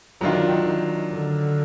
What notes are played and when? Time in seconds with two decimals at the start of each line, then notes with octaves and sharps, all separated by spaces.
0.21 D#3 F#3 D4 F4
0.66 D#3
1.13 D3